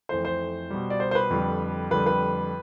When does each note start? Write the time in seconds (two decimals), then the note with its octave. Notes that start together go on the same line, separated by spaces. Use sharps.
0.09 F2 E3 A3 C5
0.25 C5
0.70 B2 G3
0.90 D5
1.00 C5
1.11 C5
1.15 B4
1.30 F2 D3 G3
1.91 F2 D3 G3 B4
2.06 B4